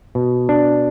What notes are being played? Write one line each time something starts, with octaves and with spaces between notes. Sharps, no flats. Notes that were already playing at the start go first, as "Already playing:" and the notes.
B2
D4